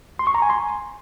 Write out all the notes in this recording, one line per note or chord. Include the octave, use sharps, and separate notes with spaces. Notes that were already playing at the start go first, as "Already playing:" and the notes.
C6
C#6
A#5
G#5
C6